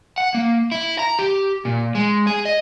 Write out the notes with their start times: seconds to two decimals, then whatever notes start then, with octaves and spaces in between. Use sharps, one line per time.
0.18 F#5
0.34 A#3
0.72 E4
0.99 A#5
1.19 G4
1.65 A#2
1.95 G#3
2.27 G#4
2.45 D#5